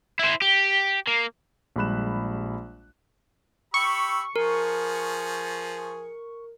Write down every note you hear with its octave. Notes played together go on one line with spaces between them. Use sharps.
E4 C5
G4
A#3
A#1 G3 G#3 B5 F#6 E7
G4 B5 C#6 E6
F3 G#4 A#4